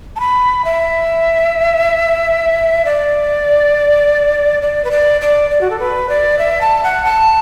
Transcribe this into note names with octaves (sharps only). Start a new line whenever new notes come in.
A5
B5
E5
D5
D5
B4
D5
D5
D5
F#4
A4
B4
D5
E5
A5
F#5
A5